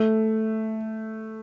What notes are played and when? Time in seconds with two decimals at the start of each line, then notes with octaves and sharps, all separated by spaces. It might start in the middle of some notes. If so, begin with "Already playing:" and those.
Already playing: A3